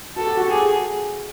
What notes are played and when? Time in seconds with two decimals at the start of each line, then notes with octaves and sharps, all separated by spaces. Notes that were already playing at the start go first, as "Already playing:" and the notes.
0.16 F#4 A4
0.27 G4
0.37 F#4
0.48 G4 G#4
0.58 F#4